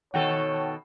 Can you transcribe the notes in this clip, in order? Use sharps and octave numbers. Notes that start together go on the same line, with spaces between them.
B2 D#3 A4 C#5 F#5 G5 A5